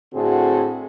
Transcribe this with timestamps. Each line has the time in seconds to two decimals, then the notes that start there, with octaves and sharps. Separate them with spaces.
0.14 A2 D3 C4 F#4 G#4 A4